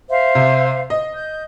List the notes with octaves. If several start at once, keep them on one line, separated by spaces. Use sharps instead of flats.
C5 E5 F5
C3
D#5
G6